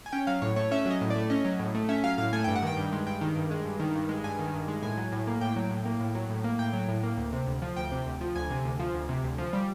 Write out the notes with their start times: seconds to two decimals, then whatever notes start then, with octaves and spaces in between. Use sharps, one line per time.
0.06 G#5
0.12 C#4 G5
0.27 F#3 F5
0.42 A2 C#5
0.56 A3 C#5
0.71 C#4 E5
0.86 F#3 D#5
1.01 A2
1.10 D5
1.16 A3
1.30 C#4 D#5
1.45 F#3
1.59 A2
1.75 A3
1.89 C#4 E5
2.04 F#3 F5
2.18 A2 F5
2.33 A3 G#5
2.44 G2 G5
2.56 F#5
2.62 D#3 G5
2.77 G2
2.92 G#3
3.06 G2 G5
3.21 D#3
3.36 G2
3.51 G#3
3.65 G2
3.80 D#3
3.95 G2
4.09 G#3
4.24 G2 G#5
4.39 D#3
4.53 G2
4.68 G#3
4.83 A2 G#5
4.97 F#3
5.12 A2
5.27 A#3
5.41 A2 G5
5.56 F#3
5.71 A2
5.85 A#3
6.00 A2
6.15 F#3
6.30 A2
6.44 A#3
6.59 A2 G5
6.73 F#3
6.88 A2
7.03 A#3
7.17 D2
7.33 C3
7.47 D2
7.62 F3
7.76 D2 G5
7.92 C3
8.06 D2
8.21 F3
8.36 D2 G#5
8.50 C3
8.65 D2
8.79 F3
8.94 D2
9.09 C3
9.24 D2
9.38 F3
9.53 G3